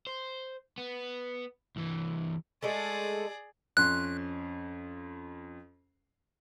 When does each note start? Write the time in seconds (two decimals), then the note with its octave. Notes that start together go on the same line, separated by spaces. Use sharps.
0.07 C5
0.78 B3
1.76 C2 E3
2.63 G#3 A3 G#4 A4 D5
3.77 F2 C#4 C6 F#6